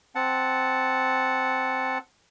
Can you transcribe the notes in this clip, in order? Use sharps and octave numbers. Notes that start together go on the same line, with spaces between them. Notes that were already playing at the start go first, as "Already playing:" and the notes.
C4 F#5 A5